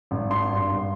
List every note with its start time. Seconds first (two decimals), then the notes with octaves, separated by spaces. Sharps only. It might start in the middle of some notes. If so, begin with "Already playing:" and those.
0.11 G#1
0.30 D4 C6
0.51 G2
0.69 G2